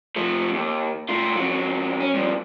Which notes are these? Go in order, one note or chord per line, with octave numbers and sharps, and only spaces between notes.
F3 A3
D#2
A3 F4
F2 F#3
C#4
G2 F3